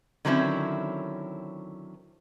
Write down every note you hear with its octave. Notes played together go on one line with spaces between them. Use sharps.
D3 D#3 F#3 C4 C#4 E4